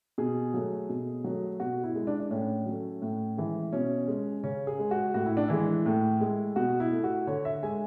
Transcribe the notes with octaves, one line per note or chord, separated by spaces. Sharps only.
B2 G#4
F#3 A3
B2
F#3 A3
B2 F#4
E4
G#3
D4
D4
A2 C#4
F#3 A3
A2
E3 G#3
B2 C#4
G#3
C#3 C#4
G#4
G#3
F#4
A2 F#4
E4
D4
E3 G#3 E4
A2
G#3
B2 F#4
E4
A3
F#4
D3 C#5
E5
G#3 G#5